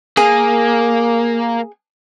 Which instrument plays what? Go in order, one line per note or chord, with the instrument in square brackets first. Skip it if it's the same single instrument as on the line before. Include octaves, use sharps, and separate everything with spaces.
[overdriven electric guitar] A#3 [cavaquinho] G#4